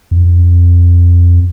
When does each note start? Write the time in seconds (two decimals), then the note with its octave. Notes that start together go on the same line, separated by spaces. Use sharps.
0.11 F2